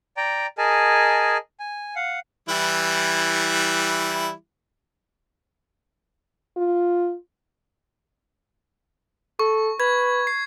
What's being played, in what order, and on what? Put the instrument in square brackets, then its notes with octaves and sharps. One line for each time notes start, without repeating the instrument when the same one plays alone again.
[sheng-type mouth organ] D5 G5 A#5
G#4 A#4 D#5 G#5 A5
G#5
F5 F#5
[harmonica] E3 G3 E4
[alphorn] F4
[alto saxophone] A4 [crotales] C#6
[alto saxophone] B4 [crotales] G#6
[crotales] C7